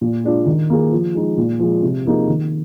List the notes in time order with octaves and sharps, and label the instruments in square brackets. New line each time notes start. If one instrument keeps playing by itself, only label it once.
[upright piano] A#2
G#3 D4 F4
D#3
A#3 F4 G#4
F3
G#3 D#4
A#2
F3 G#3
C3
F3 A#3 D#4 G#4
D#3